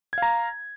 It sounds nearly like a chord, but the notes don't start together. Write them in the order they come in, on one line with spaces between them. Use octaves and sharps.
G#6 F5 A#5